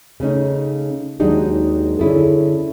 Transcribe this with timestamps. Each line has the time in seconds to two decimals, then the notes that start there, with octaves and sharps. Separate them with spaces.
0.20 C#3 A3 C#4 D#4
1.20 D#2 F#3 G#3 D4 D#4 G4
1.99 D3 C#4 E4 G#4 A4